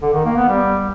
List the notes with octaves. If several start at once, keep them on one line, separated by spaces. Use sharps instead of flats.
D3
D#3
A#3
B3
G3